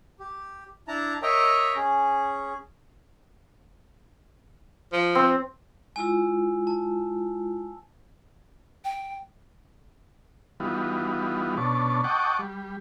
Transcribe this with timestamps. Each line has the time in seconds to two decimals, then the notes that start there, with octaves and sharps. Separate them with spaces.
0.20 G4
0.88 D4 E4 A5 A#5
1.22 A#4 C#5 D#5 E5 G5 A#5
1.76 C#4 G#4
4.93 F3
5.15 C4
5.96 G#3 E4 F4 G#5 E6
6.67 A5
8.84 G5
10.60 E3 G3 B3 D#4 F4 F#4
11.57 B2 C#4 D4 A5
12.04 D#5 F#5 G5 A5 C#6 D6
12.39 G3